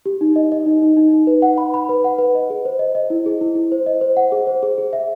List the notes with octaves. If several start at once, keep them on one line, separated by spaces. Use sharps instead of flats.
G4
D#4
D#5
D#5
D#4
D#4
D#4
D#4
B4
F#5
B5
B5
B4
F#5
B4
D#5
G#4
C5
D#5
D#5
E4
G#4
E4
E4
C5
D#5
C5
F#5
G#4
C5
G#4
G#4
E5